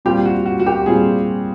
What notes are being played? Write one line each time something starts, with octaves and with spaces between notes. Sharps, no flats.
A#2 G3 C4 F4 G4
F#4
F#4
F#4
G4
A#2 G3 C4 F4 G#4